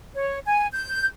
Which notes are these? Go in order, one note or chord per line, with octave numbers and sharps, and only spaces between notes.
C#5
G#5
G6